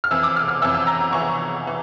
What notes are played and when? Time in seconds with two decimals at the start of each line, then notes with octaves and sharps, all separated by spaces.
0.04 F6
0.11 F2 E3 E6
0.23 D6
0.36 F6
0.48 F6
0.62 F2 E3 E6
0.74 E6
0.87 A#5
1.00 A#5
1.13 F2 E3 C#6
1.67 E3